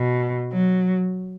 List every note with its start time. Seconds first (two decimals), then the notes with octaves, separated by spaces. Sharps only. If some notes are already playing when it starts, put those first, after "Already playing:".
Already playing: B2
0.52 F#3